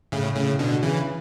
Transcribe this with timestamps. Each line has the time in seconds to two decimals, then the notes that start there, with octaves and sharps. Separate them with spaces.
0.12 A2 C#3
0.35 A2 C#3
0.59 B2 D3
0.82 C#3 E3